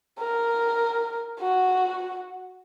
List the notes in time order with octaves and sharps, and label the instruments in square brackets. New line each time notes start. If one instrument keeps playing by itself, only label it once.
[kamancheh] A#4
F#4